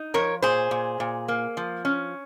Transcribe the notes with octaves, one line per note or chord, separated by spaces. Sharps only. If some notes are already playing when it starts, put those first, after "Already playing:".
Already playing: D#4
F3 A#4 C#5
A#2 G#4 C5
A#2
A#2
A#3
F3
C#4